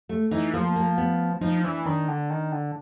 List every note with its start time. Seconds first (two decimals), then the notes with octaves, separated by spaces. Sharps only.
0.09 A3
0.31 E3 D#4
0.54 F3 A#3
0.76 A#3
0.98 B3
1.41 F3 D#4
1.64 E3 D4
1.85 D#3 D4
2.08 D3
2.30 D#3
2.52 D3